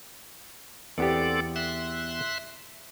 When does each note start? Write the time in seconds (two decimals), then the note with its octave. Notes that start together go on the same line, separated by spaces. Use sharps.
0.98 E2 B3 C4 G4 A4 D5
1.56 E5 C6 F#6